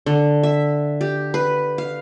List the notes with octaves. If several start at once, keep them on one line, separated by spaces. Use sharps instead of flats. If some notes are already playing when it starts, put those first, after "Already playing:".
D3
E5
G4
B4
F5